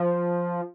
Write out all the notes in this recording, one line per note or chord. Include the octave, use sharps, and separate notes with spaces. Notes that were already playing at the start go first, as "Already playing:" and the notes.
Already playing: F3